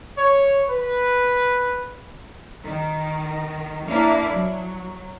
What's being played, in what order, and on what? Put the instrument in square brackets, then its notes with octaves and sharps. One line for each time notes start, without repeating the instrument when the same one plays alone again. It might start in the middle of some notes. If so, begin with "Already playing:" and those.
[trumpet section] C#5
B4
[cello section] D#3
A#3 D4 E4 F5
F#3